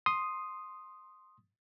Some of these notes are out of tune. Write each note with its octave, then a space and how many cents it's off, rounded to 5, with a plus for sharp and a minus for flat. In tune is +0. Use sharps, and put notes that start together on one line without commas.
C6 +5 D#6 +0